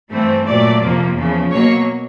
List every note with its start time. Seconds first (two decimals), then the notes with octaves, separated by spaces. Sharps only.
0.10 G2 E3 A3 C4
0.46 A#2 F#3 A3 D5
0.81 F2 C3 F3 A#3
1.15 E2 C#3 F3
1.51 B2 F#3 A#3 C#5